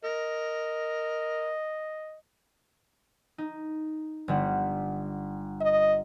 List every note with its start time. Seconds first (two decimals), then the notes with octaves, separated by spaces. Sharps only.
0.04 A#4 D#5
3.38 D#4
4.28 G1 G3 F#5
5.61 D#5